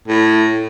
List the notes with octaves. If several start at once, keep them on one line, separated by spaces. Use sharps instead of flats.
A2